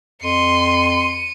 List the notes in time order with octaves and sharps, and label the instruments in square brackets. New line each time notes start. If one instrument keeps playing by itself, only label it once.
[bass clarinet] F2 [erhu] C6 [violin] C#7 D#7